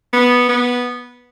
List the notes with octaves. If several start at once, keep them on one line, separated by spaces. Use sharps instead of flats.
B3
B3